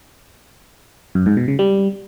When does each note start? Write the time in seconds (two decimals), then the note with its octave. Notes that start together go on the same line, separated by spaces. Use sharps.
1.15 F#2
1.26 G#2
1.37 B2
1.48 C#3
1.59 G3